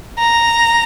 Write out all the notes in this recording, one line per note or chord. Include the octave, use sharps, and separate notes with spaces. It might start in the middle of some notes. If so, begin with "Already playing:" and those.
A#5